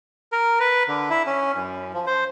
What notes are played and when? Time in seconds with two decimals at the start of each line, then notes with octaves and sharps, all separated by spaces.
0.32 A#4
0.60 B4
0.88 D3
1.10 E4
1.27 C#4
1.55 F#2
1.94 F3
2.07 C5